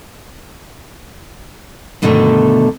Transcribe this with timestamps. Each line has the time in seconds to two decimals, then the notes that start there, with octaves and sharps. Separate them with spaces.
2.02 G2 B2 D3 D#3 G3 A3